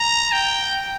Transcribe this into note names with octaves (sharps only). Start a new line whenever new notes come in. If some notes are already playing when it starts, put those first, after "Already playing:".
Already playing: A#5
G5